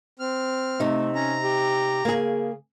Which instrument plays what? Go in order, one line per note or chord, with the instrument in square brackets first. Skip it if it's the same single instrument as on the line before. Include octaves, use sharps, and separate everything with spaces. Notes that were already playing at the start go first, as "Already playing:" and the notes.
[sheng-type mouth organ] C4 F6
[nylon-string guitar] C3 D#4 [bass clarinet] A3
[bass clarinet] C#4 [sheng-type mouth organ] A#5
[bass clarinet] G4
[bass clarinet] C#3 [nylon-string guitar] A#3 G#4